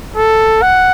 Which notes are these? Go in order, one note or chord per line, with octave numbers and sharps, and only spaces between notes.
A4
F#5